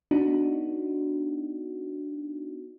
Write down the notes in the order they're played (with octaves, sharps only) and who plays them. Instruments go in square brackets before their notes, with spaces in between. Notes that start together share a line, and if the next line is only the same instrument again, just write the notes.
[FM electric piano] B3 D4 D#4 F#4